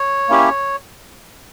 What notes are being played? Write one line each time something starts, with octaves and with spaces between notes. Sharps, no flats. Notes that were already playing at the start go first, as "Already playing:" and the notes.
Already playing: C#5
A#3 C#4 E4 G4